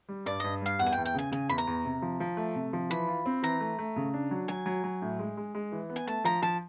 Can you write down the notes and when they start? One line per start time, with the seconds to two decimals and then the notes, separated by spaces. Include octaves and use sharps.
0.09 G3
0.26 G2 D5
0.40 G2 D#5
0.61 G3 F5
0.79 E2 F#5
0.86 G#5
0.92 G5
0.97 E2
1.05 G5
1.14 C#3 G#5
1.32 C#3 G#5
1.49 E2 B5
1.58 A#5
1.67 E2
1.85 C3
2.02 F3
2.20 F3
2.37 A3
2.55 C3
2.73 F3
2.90 E3 B5
3.08 F4
3.26 C4
3.43 E3 A#5
3.60 A3
3.79 A3
3.96 C#3
4.14 D4
4.31 F#3
4.48 F#3 G#5
4.66 F#3
4.84 F#3
5.02 A2
5.19 G#3
5.37 G#3
5.55 G#3
5.72 E3
5.89 B3
5.96 G#5
6.07 A3 A5
6.24 F3 A#5
6.42 F3 A5